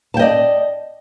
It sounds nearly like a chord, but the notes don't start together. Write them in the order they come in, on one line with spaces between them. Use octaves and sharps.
A5 G5 D#5 D5